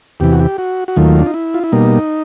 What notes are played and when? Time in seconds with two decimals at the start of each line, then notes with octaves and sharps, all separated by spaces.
0.20 E2 C3 E3 G4
0.32 F#4
0.40 G4
0.58 F#4
0.88 F#4
0.96 D#2 D#3 F#3 A3 F4
1.19 D4
1.26 D#4
1.34 E4
1.54 F4
1.64 E4
1.72 B2 G3 A#3 D#4